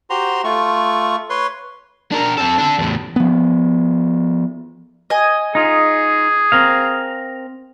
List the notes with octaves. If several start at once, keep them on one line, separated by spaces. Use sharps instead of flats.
F#4 G4 C5 A#5 C6
A3 F4 C#6
B4 C#5 C6
D4 A#4
C4 A4
D4 A4
E2 A2
F3 B3
D#5 G#5
D#4 F4 G#4
C4 A#4 F5